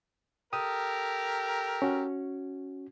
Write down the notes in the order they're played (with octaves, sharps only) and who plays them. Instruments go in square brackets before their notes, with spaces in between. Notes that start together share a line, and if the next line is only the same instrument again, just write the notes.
[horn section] G4 A4 A#4 [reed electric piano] D#6
[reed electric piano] C#4 F#4